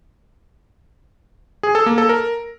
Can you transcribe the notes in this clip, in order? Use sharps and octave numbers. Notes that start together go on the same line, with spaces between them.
G#4
A4
A#3
A4
A#4